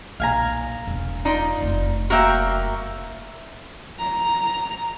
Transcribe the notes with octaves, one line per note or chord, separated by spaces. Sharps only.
B1 A#2 F5 G#5 A#5
E1 F#2
D#4 F4 D5
F1 F#2
A#3 F#4 A#4 E5 G5
A#5